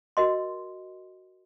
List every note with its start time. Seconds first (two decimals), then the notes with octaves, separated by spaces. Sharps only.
0.17 F#4 A#4 D#5 C6